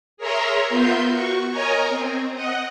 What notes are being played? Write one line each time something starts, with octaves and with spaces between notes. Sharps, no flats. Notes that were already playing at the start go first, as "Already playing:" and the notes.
G#4 A#4 C#5 E5 A#5 C6
B3 F4 A#4 E5 C6 G6
F#4 C#6
A#4 C#5 D#5 G#5 A#5
C4
D#5 F#5